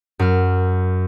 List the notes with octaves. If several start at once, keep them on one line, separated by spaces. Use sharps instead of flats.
F#2 F6